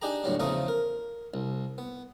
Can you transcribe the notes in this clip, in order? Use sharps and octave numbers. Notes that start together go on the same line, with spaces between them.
D4 D#4 G4 G#4 A#5
D2 A2 F#3 G3
E2 C#3 F3 A3 A#5 D#6
A#4
C2
B3